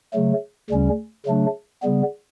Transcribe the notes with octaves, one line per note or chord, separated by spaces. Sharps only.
C#3 F#3 A3
D2 C#3 G3 C#4
C#3 F#3 A3 D4
C#3 G3 B3